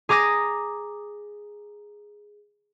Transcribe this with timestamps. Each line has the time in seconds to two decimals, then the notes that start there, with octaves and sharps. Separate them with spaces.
0.09 G#4 A#5 D6 D#6 A#6